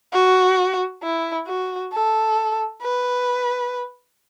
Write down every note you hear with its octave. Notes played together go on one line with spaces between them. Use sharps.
F#4
E4
F#4
A4
B4